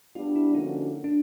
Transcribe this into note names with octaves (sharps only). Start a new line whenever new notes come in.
G3 B3 D4 F4
E4
D3 F3 A#3 C#4 D#4 F#4
D4